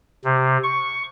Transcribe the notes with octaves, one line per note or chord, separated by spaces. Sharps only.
C3
C#6